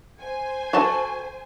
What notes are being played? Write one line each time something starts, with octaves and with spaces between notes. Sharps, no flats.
C5 G#5
F#4 A4 A5